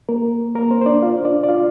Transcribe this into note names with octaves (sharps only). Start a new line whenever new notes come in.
A#3 A#4
A#3 A#4
C4 C5
C5
D4 D5
F4 F5
D4 D5
D5
F4 F5